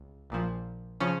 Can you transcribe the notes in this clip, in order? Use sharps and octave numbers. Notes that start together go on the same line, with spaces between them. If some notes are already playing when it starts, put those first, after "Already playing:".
Already playing: C#2
A#1 A#2 F3
C#3 F3 C#4